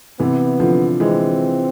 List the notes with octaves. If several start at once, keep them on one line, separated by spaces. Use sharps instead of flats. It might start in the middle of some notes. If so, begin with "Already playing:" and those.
C3 E3 B3
D3 F3
E3 G#3 C4